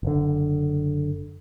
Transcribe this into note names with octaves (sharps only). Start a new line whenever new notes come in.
F#1 D3